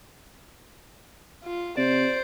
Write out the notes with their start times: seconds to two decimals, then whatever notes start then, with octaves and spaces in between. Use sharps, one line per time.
1.44 F4
1.77 C3 C5 D5